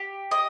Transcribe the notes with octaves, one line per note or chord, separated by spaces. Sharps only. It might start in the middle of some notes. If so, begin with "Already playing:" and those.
Already playing: G4
D#5